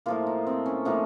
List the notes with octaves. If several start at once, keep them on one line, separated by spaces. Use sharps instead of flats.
A2 F3 A#3 F4
D#4
C4
C#4
A2 F3 A#3 D#4